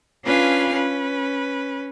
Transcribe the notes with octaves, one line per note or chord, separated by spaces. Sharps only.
C#4 D4 F4 B4 F5 G#5
C#4 B4